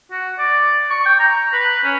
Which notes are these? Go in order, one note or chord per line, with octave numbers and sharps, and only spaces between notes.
F#4
D5
C#6
G5
A#5
B4
C#4